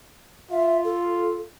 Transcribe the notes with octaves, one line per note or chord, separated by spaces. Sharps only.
F4 E5
A4